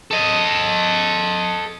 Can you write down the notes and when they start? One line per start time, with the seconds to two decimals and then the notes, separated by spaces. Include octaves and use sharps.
0.11 A4 D#5